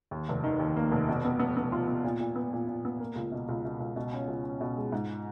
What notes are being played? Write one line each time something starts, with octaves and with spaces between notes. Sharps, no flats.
D#2
F1
D#3
D#2
A#3
F1
B2
B3
B3
B3
F4
B3
A#2
A#2
B3
A#2
A#2
B3
A#3
C#2
B2
C#2
B2
C#2
B2
C#4
C#2
C#4
B2
G#3
G#2